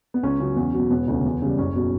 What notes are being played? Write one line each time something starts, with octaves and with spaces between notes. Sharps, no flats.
B3
C#2 C#4
C#3 F#3
E2
F#3
B2
E1 B3
D2 C#3
E2
C#3 G3
F#1 C#4
B2 F#3